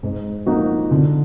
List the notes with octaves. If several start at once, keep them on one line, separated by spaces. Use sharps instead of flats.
G#2
F3 A#3 D#4 F#4
D3